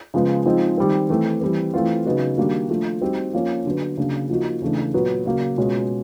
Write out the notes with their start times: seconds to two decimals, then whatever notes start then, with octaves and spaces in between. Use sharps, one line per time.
0.14 C#3 F3 G#3 B3
0.45 F3 G#3 C4 D#4
0.78 D#3 G3 C4
1.09 E3 A3 C4
1.41 E3 G3 C4
1.74 E3 A3 C4 F4
2.06 C#3 F#3 B3 D#4 F#4
2.37 D#3 G3 A#3 D4 F#4
2.69 F3 A3 D4
3.01 G3 C4 D#4 F#4
3.33 F3 A#3 C#4
3.66 D3 F#3 B3
3.97 C#3 F#3 A#3 D4
4.30 F3 A#3 D#4 F#4
4.62 C#3 E3 A3 D4
4.94 A#2 F#3 B3
5.26 C#3 F#3 A#3
5.58 B2 G#3 C#4 F4